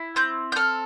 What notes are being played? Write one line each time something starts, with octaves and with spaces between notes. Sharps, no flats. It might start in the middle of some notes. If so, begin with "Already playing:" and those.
Already playing: E4
C4 G6
G6
A4 F6